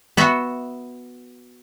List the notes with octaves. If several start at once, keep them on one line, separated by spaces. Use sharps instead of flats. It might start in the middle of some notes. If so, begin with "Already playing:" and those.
B3 F#4 E5